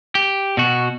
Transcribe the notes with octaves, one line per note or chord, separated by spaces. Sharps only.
G4
B2 F#4